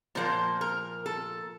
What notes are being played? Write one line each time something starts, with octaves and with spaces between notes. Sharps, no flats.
A#2 F3 A#3 C5
A#4
A4